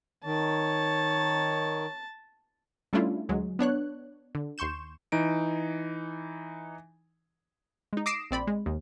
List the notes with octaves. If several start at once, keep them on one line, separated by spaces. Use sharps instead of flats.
D#3 C#5 A5
G3 A3 C#4 D4 E4 F4
D2 F#3 G#3
B3 D4 C#5 F#6
D3
D#2 C6 C#6 G6 E7
E3 D#4 D7
G#3 D#4
D6 D#6 A#6 C7 D7 E7
A#1 C4 D5 B5
G#3
D#2